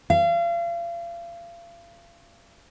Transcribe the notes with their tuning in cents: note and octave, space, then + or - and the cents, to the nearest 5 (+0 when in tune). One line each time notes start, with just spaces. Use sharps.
F5 -35